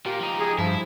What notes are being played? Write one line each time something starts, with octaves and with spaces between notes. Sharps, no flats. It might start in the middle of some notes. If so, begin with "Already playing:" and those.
A#2 A#3 G4
F3 D#4
G#4
G2 F3 E4